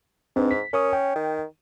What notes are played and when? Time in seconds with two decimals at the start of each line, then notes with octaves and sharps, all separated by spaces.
0.36 G#2 C4 D4 B4
0.51 B6
0.73 C#4 A#4 C#6 D#6
0.93 G5
1.15 D#3